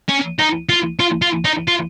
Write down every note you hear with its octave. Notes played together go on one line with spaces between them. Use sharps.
C#4
D#4
F4
F4
F4
D#4
F4